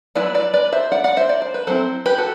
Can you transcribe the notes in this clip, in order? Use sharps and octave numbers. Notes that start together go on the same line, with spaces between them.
F#3 B3 E4 B4 D5
B4 D5
B4 D5
C5 E5
D5 F#5
D5 F#5
C5 E5
D5
C5
B4
F#3 C4 E4 A4 C5
G4 B4
F#4 A4